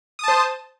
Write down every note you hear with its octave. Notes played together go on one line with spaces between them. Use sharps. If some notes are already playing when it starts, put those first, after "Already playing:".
C5 A5 D#6